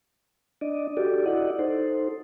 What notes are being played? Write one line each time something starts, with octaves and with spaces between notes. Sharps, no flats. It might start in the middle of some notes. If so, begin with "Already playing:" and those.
D4 D5 D#5
F#4 G4 A4 D5
E4 D5 D#5 F#5
D#4 A4 C5